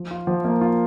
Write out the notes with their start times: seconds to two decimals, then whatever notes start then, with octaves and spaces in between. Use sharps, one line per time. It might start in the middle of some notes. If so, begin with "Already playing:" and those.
Already playing: F3
0.11 F4
0.27 F3
0.44 A#3
0.61 F4